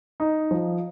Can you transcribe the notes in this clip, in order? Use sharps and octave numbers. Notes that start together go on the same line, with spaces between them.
D#4
F3